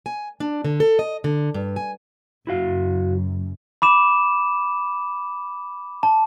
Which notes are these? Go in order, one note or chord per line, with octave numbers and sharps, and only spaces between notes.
G#5
D4
D3
A4
D#5
D3
G2
G#5
F#1 F#2 E4 F#4 F5
B5 D6 E7
A5